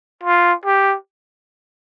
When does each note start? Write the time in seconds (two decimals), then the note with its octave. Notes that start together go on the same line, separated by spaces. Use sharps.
0.23 F4
0.65 G4